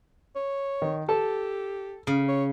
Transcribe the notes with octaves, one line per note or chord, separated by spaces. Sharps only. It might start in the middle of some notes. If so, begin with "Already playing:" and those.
C#5
D#3
G4 A4 A5
C#3
C#5